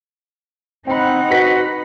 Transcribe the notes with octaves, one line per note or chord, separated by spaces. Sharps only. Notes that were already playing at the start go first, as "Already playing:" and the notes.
C4 D#4 F#5 G5 B5
F#4 B4 A#6 B6